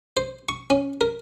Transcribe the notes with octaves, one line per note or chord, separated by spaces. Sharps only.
C5
C#6
C#4
A#4